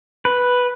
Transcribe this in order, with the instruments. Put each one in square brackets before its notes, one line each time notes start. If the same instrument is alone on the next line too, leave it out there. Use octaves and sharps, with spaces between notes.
[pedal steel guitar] B4